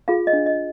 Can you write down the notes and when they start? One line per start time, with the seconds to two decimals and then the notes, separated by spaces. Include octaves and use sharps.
0.08 F4 G#4 F5
0.27 D#5
0.33 D4
0.46 D#5